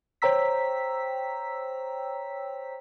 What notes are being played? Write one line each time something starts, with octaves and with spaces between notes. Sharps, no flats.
C5 C#5 G5 A#5 E6 B6